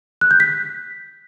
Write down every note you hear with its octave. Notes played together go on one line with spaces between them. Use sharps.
F#6
G6
B6